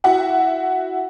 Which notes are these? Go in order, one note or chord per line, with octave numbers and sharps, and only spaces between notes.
E4 F#4 E5 F#5